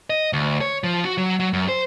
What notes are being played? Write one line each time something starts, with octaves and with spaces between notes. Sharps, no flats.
D#5
D2
C#5
F3
F#4
F#3
F#3
F#2
C5